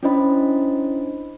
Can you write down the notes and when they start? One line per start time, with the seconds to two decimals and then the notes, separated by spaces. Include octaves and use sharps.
0.03 C#4 D4 E4 C5 D#5 B5